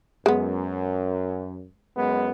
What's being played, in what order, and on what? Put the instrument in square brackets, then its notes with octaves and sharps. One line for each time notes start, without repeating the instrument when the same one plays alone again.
[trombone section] F#2 [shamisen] G#3 B3
[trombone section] F#2 G#3 B3